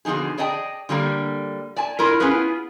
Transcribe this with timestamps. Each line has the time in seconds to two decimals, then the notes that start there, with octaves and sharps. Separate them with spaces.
0.05 B2 D3 F3 D#4 G#4
0.38 G#4 D5 D#5 G5 A5
0.89 D3 G3 A#3 D5
1.76 D5 G#5 A5
1.99 D4 E4 F4 A#4
2.20 B3 C#4 E4 F4 G#4 B4